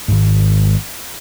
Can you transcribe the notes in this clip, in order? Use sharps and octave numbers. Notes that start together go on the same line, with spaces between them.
G#1 G#2